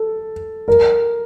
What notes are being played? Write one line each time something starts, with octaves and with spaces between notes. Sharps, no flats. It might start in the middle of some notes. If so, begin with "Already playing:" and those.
Already playing: A4
A#4